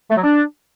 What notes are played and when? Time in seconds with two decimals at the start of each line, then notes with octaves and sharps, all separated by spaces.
0.10 A3
0.17 F#3
0.23 D4